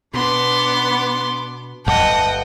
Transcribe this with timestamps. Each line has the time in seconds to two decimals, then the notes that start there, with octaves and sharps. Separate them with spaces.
0.14 B2 B3 D4 C6 D6
1.86 D1 G1 D#5 F#5 G5 A5